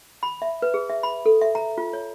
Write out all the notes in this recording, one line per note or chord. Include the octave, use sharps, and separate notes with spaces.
B5
E5
B4
G#4
E5
B5
A4
E5
A#5
F4
C#5